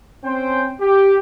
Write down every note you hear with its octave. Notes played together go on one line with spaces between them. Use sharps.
C4 C#4 C5 G5
G4